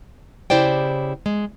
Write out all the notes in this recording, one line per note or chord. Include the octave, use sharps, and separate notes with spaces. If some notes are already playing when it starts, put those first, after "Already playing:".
C#3 E4 G4 C5 D5 G5
G#3